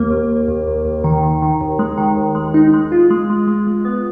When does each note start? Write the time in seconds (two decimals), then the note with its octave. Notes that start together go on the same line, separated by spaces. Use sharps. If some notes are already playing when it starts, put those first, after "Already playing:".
Already playing: D#2 A#3
0.10 D#2
0.29 D#2
0.48 D#2
0.67 D#2
0.85 D#2
1.04 D#3
1.23 D#3
1.42 D#3
1.61 D#2
1.79 G#3
1.98 D#3
2.17 D#2
2.35 G#3
2.54 D#4
2.73 G#3
2.92 F4
3.10 G#3
3.30 G#3
3.47 G#3
3.67 G#3
3.85 B3